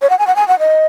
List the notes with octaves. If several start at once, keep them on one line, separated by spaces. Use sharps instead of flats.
C#5
F#5
G#5
F#5
G#5
F#5
D#5